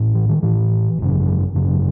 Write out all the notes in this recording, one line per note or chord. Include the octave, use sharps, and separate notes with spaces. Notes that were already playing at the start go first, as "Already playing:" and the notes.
Already playing: A1 A2
E3
D#3
A1 A2 E3
G#1 F#2 C#3
G#1 F#2 C#3